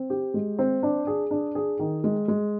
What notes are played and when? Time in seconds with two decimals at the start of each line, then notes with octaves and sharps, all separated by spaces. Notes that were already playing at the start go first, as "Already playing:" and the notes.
Already playing: C4
0.10 G4
0.34 G#3
0.59 C4
0.83 D4
1.07 G#4
1.31 D4
1.55 G#4
1.79 D#3
2.04 G#3
2.28 G#3